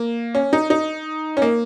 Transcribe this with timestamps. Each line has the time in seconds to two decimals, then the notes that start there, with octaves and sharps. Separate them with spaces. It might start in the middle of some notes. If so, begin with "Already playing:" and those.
Already playing: A#3
0.35 C#4
0.53 D#4
0.70 D#4
1.37 C#4
1.42 A#3